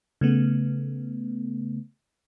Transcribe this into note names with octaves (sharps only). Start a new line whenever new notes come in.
C#3 A3 B3